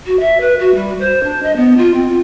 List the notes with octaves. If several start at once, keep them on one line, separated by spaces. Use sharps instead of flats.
F#4
E5
B4
F#4
G3
C5
D4
D#5
B3
F4
C4
F4